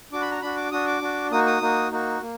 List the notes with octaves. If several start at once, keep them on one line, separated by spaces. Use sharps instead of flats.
D4 F#4 D6
B5
A#5
D4 F#4 B5
D6
D4 F#4 D#6
D6
D4 F#4
A#3 D#4 F#4 D#6
D#6
A#3 D#4 F#4
A#3 D#4 F#4
A#3